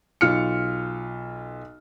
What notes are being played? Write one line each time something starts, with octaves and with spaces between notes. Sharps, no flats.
B1 F4 F6 C#7